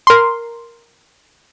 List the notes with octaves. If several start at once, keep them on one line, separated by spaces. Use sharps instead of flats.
A#4 C6